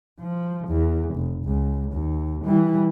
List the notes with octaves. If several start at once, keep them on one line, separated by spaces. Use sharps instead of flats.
F3
E2
F1
C#2
D#2
E3 G3